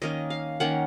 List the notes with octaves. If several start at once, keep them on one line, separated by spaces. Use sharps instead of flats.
D#3 A#3 C#4 D#5
F5
D#3 A#3 C#4 F#5